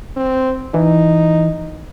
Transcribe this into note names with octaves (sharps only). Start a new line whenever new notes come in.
C4
E3 D#4